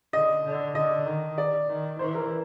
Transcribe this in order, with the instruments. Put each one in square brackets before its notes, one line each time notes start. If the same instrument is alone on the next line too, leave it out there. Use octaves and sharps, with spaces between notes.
[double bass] D3 [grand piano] D#5
[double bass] D3
[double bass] D3 [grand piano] D#5
[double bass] D#3
[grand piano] D5
[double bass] D#3
[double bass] E3 [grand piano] C5
[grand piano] A#4